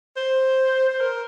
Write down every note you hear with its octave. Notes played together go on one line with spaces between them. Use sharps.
C5
C5
A#4